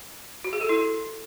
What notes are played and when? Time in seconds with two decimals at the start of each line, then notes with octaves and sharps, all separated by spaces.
0.44 F#4
0.53 G#4
0.61 A4
0.69 E4